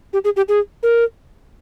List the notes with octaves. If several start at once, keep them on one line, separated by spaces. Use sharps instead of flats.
G4
G#4
G4
G#4
A#4